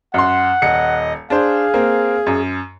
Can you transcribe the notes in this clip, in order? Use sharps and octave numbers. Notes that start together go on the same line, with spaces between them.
F#2 F#5 C6
D#1 D#5 C#7
D4 G#4 C5 F5
A#3 C4
F#2